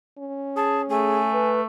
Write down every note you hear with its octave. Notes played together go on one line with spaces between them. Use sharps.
C#4
G#4 A5
A3 G#4 G#5
B4